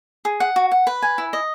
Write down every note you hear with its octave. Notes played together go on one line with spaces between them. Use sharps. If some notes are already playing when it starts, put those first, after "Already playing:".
G#4
F#5
F#4
F#5
B4
G#5
E4
D#5